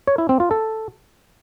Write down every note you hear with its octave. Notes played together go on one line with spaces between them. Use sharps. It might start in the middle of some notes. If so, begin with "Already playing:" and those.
C#5
E4
C4
F4
A4